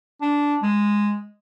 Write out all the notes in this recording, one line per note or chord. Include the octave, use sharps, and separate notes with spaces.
D4
G#3